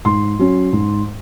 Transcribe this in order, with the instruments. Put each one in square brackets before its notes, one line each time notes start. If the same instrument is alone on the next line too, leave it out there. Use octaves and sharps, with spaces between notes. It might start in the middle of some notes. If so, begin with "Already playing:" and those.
[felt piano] G#2 C6
F#3 C#4
G#2